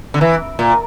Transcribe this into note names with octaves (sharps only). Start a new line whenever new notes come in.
D3
E3
A#2